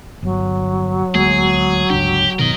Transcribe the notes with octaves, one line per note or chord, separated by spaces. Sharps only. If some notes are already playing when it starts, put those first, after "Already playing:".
G1 F#3
D2 G#3 A#3 G#4
G1 C#2 D4 G4
G1 B2 D#3 A#4 D#5